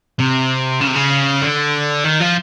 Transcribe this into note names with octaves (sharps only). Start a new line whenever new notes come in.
C3
C#3
C3
C#3
D3
D#3
F3